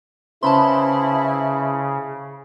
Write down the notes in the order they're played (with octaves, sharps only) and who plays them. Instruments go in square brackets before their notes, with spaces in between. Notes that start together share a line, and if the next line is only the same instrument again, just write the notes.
[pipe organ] C#3 [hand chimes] C#4 B4 C5 [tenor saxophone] E4 [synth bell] A5 B5 C6